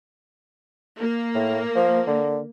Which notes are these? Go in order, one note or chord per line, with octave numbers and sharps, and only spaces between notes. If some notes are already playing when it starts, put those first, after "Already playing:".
A#3
A2
F3
D3